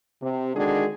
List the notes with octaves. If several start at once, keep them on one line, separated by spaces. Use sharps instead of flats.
C3
D3 D#3 G#3 D4 F#4 G#4